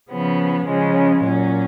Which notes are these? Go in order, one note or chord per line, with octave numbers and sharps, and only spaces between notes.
C#3 F3 B3
C#3 F3 G#3 C#4
A#2 F#3 C#4